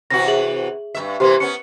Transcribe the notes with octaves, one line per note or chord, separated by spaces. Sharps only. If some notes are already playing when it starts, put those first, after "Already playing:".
C3 E3 F#4 A#6
G#4 E5 F#7
G2 A#2 E5
C3 E3 A#3 G4 C5 C6
B3 C#4 C#7